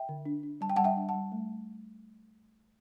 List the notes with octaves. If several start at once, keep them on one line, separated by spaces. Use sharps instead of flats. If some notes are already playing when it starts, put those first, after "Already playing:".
Already playing: E5 G5
D3
D4
D4
G3 A5
G5
G3 F#5 A5
E5 G5
D4
F#5 A5
G3
A3